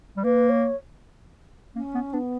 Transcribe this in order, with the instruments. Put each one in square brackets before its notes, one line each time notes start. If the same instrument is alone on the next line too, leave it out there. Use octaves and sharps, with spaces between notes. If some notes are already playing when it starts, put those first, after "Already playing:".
[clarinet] G3
[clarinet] A#3 [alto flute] B4
[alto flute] C#5
[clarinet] A#3 [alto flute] C#4
[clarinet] B3
[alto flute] B3 [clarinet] D4